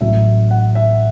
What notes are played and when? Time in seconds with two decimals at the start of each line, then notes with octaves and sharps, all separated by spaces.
0.01 A1 A2 F#3 E5
0.51 F#5
0.75 E5